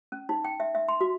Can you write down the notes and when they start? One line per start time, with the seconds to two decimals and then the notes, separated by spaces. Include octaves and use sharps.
0.12 C#4
0.29 D#4
0.45 G5
0.60 E5
0.75 E5
0.88 C6
1.01 F#4